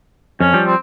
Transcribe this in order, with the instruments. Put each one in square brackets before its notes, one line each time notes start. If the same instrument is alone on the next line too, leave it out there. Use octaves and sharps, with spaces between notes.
[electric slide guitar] F2 [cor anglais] C#4
[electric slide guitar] F3 G3
[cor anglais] C4